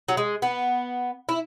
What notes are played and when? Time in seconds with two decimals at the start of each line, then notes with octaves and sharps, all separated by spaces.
0.09 F#3
0.17 G#3
0.42 B3
1.29 E4